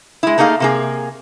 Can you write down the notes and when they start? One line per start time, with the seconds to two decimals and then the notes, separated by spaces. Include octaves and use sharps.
0.23 G#3 E4
0.38 A3 A#3 D#4 G#4 F5
0.60 C3 A#3 G#4